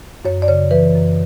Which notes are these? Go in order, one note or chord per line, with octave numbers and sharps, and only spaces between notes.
F#2 C#5
D5
C#3 C#5
E3 B4
F#2